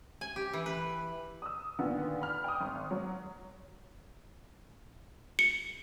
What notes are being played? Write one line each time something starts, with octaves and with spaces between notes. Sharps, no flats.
G#5
G4
E3
B4
D#6 E6
A#2 D3 D#3 B3
B5 F6
G5 D#6
G#1
F#3
C#7